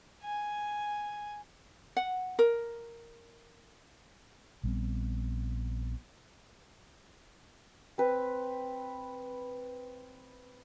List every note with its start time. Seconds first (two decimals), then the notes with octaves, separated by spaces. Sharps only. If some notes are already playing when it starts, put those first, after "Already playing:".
0.23 G#5
1.97 F#5
2.39 A#4
4.63 A#1 G3 B3 C4
7.98 C4 B4